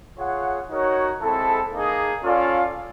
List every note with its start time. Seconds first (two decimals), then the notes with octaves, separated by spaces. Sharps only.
0.18 F4 G#4 C#5 F#5
0.70 D#4 F#4 A#4 C#5 F#5
1.21 G#3 C4 E4 A4
1.72 A#3 D#4 G#4
2.23 C#4 F4 A4 D5 F5